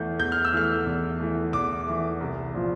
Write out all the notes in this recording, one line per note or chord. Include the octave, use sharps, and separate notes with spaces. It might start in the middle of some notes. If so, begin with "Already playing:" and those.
Already playing: E2 E3 A3 G6
E2 G6
F6
E6
E3 A3 F6
E2
E3 A3
E2 D6
E3 A3
C2
A#2 F3